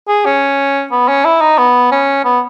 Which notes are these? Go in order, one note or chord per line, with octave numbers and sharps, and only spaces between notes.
G#4
C#4
B3
C#4
E4
D#4
B3
C#4
B3